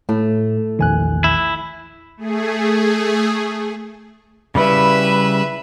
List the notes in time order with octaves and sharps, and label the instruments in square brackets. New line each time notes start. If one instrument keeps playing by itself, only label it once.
[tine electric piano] A2 [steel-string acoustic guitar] A3
[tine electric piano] A#1 G#5 F#6 [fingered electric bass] E2 D#3
[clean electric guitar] E4
[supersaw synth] A3 G#4
[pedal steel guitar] C#3 G3 E4 [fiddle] B4 E5